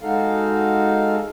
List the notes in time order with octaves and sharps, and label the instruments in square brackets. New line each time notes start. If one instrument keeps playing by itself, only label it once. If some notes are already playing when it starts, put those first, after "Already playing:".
[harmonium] G#3 D#4 F#4 A4 F5